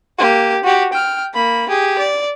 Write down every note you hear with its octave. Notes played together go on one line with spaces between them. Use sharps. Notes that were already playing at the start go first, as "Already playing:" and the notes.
A#3 G4
F#4 G4
G5 F6
A#3 B5
G4 G#4
D5